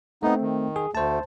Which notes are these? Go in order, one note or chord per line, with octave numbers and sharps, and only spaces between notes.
A3 B3 C4 D#4
D#3
G#4
D2 A3 C5 A5